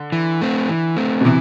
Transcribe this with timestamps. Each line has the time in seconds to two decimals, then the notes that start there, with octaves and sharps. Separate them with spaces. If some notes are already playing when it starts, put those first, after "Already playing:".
Already playing: D3
0.12 E3
0.41 A3 C4
0.69 E3
0.97 A3 C4
1.21 B2
1.25 C3 E3